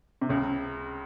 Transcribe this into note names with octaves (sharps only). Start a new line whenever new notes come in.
C3
C#2 C#3